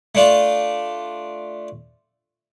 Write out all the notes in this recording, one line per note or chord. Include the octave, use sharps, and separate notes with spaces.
A3 D4 F4